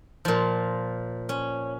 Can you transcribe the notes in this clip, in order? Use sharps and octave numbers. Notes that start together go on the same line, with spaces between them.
A#2 F3
C#4